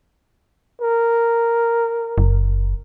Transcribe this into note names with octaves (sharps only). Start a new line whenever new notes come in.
A#4
F#1